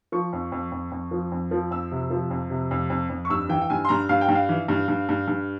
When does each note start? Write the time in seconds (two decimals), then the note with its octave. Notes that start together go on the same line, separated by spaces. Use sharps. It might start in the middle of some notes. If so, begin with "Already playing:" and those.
0.12 F3 C#6
0.33 F2
0.52 F2
0.72 F2
0.92 F2
1.11 F3
1.32 F2
1.51 F3
1.71 F2 E6
1.92 C3
2.10 F3
2.31 F2
2.50 C3
2.71 F2
2.90 F2
3.10 F2
3.25 C#6
3.30 G2 E6
3.49 E3 G5
3.62 G5
3.70 G2 G#5
3.85 C6
3.89 G2 A#5
4.09 G2 F5
4.21 G5
4.28 G2
4.35 F5
4.49 E3
4.68 G2
4.88 G2
5.09 G2
5.28 G2